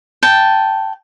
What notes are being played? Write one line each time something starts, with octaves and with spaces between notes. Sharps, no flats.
G5 A5